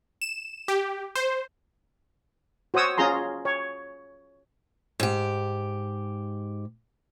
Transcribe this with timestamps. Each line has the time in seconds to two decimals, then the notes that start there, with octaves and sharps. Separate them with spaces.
0.21 E7
0.68 G4
1.15 C5
2.74 F#4 C5 C#5 D#6 E6
2.98 C#4 F4 G#4 A#5 C6
3.45 C#5
5.00 G#2 G4